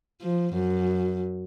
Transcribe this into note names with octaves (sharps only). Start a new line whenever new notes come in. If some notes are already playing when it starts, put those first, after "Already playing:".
F3
F#2